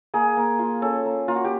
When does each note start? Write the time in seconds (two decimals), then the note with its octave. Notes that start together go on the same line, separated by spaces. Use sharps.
0.14 A#3 G#4
0.37 A#3
0.59 F4
0.82 C#4 A4
1.06 A#3
1.28 A#3 F4
1.36 F#4
1.44 G4